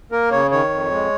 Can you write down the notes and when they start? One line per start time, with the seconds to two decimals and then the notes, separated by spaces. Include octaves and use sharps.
0.12 A#3 A#4
0.31 C#3 C#5
0.51 D#3 C#5
0.71 F2
0.90 G#3